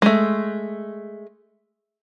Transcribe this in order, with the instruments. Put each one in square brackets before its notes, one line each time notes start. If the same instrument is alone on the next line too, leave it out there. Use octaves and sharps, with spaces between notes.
[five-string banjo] G#3 A3